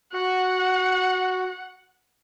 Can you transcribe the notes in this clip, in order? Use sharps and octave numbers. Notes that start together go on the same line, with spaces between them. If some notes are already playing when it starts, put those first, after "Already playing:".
F#4 F#5